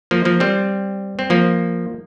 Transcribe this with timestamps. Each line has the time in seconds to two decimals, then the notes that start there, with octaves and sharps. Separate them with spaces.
0.11 F3 A#3
0.25 F3 A#3
0.40 G3 C4
1.19 C4
1.30 F3 A#3